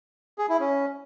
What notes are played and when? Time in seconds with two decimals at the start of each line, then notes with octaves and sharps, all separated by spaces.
0.38 G#4
0.49 E4
0.60 C#4